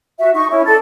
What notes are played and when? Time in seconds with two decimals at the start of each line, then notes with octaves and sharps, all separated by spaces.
0.19 F#4 E5
0.34 D#4 C#6
0.49 C#4 E4
0.65 A4 D5